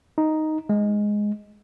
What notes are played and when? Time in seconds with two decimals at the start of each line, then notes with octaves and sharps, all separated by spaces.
0.18 D#4
0.69 G#3